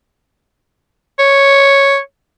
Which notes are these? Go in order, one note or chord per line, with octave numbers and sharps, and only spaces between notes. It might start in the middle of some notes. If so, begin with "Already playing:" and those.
C#5